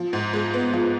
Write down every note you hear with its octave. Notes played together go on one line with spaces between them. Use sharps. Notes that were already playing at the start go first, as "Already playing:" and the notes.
Already playing: F3
G#2
G#3
B3
F3